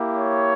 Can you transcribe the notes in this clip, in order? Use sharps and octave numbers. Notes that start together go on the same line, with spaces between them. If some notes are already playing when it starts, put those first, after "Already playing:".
Already playing: A#3 E4 G4
C#5